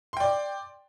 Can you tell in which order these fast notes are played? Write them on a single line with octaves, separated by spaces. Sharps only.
C6 G5 D5